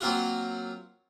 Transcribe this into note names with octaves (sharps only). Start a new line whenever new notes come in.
F#3 A#3 C4 F4 F#4